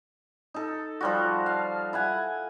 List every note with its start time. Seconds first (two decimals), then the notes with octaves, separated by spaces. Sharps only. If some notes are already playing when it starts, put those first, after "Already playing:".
0.54 D#4 A4
1.01 F3 G3 F#4
1.46 F5
1.93 E4 F#5 G#5